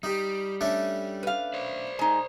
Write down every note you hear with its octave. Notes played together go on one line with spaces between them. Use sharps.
G3 D#4 G4
A3 C#4 D4
B4 F5
C5 D5
G#3 D#4